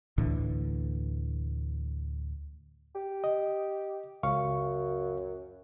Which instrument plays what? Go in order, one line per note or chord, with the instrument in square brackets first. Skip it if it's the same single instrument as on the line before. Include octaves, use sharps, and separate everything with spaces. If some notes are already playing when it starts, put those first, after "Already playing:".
[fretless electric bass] D2 A2 D3 E3
[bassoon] G4
[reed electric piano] D#5
[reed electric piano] C#2 F5 C#6 [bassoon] F#2